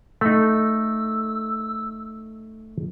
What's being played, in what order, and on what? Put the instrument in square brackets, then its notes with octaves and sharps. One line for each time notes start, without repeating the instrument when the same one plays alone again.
[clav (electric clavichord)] A3 D#4 [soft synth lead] E6